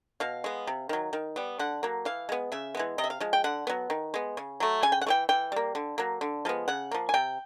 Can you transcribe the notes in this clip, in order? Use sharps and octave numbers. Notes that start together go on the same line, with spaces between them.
B2 F5
G#3 B3
C3
D#3 F#3
D#3
G3 B3
D3 F#5
F#3 A#3
E3 F5
G#3 B3
C#3 E5
E3 G#3 B3
C3 D#5
E5
F5
F3 G#3
G5
D3 F#5
F#3 B3
D#3
G#3 B3
C#3
F#3 A3
C#3 G#5
G5
F#5
E3 A3 G5
E3 G5
G3 A#3
D3
F#3 A#3
D3
F3 G#3 B3
C#3 F#5
F3 A#3
G#5
C3 G5